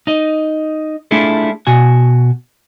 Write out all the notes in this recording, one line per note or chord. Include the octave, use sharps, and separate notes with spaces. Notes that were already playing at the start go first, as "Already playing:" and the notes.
D#4 D#5
A3 D4 E4 F4 G#4 A4
B2 F#4 G#5